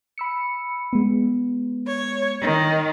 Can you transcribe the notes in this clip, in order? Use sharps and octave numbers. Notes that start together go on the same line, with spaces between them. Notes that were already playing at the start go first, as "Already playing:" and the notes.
B5 E6 C#7
G#3 B3
C#5
D#3